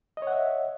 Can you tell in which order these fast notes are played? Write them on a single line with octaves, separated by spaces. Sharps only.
D#5 C#5 F#5 E5